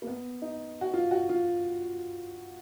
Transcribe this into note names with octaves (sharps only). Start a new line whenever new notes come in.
A#3
B3
D#4
F#4
F4
F#4
F4